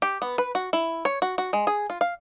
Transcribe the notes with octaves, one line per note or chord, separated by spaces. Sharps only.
G4
B3
B4
F#4
E4
C#5
F#4
F#4
G#3
G#4
F4
F5